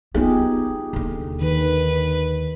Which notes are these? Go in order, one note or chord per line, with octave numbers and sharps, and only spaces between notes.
B3 D#4 F4 G4 G#4
D#2 D3
D#3 B4